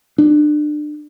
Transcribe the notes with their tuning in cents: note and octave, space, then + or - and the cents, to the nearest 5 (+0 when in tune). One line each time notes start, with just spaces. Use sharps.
D4 +30